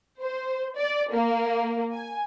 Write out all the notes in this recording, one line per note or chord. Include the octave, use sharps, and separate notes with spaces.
C5
D5
A#3
G#5